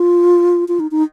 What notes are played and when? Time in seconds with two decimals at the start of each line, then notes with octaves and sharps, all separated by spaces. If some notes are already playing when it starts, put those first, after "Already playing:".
Already playing: F4
0.68 F4
0.80 D#4
0.91 D#4